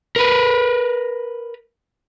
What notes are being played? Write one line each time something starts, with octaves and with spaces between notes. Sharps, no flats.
A#4 B4